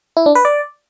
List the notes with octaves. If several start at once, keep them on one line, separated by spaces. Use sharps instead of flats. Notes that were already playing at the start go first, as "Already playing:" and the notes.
E4
D4
B4
D5